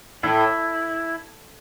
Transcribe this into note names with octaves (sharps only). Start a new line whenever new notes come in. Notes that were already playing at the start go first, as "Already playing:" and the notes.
A2 E4